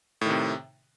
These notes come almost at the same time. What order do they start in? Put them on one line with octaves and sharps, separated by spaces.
A2 D#3 C3